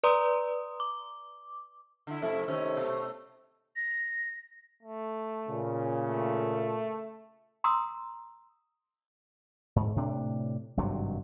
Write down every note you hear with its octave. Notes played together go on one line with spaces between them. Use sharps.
B4 D5 A#5 C6 D#6
D6
D3 E4
F2 C3 A3 E4
C3 D#3 A3 C#4
B2 A3
A#6
A3
A#2 C#3
A3
A#5 C6 D#6 E6
G#2
A2 C3 D4
G#1 G2 C3 F#3